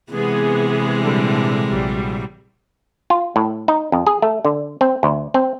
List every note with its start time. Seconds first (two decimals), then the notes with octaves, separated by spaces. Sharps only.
0.12 C3 E3 G#3 B3 G#4
1.01 A#2 D3 G3
1.66 A#1 F#3 G3
3.10 F4
3.36 A2
3.68 D#4
3.92 F2
4.07 G#4
4.22 A3
4.45 D3
4.81 C4
5.03 D2
5.34 C4